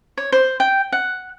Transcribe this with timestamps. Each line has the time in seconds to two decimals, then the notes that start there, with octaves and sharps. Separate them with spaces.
0.17 C#5
0.32 C5
0.60 G5
0.92 F#5